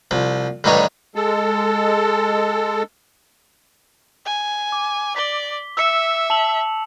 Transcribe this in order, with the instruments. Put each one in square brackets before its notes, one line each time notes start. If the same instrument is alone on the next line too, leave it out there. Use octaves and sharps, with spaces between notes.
[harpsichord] C2 F3
A1 G2 D#3 G3 D#4 C#5
[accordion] G#3 A4
[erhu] G#5
[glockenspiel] D6
[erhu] D5 [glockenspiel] B6 G7
[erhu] E5 [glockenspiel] E6 C#7 E7
[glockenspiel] A5 F7 F#7